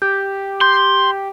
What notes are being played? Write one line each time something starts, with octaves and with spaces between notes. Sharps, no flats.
G4 G6
C6 G6